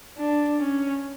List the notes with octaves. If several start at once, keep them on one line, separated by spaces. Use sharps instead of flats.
D4
C#4